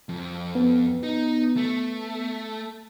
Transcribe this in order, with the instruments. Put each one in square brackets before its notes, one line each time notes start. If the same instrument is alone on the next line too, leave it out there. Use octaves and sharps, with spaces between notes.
[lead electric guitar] F2
[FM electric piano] B3
[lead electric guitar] D#4
A3